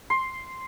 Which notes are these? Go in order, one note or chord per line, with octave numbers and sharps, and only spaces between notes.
C6